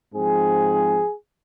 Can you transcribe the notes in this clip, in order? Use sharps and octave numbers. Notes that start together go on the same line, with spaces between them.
G#2 F3 C4 G#4